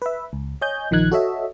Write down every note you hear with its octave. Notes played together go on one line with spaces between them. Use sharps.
B4 E5
C#2
C#5 D#5 G#5 G6
A#1 D#3 F3 D#4 F#6 G#6
F#4 A4 C#5 D#5 E5